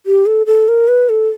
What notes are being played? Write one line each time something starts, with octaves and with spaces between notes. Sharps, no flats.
G4
A4
A4
A#4
B4
A4